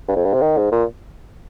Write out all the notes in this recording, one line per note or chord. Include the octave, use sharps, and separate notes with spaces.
G2
F2
G2
C3
D#3
G#2
A#2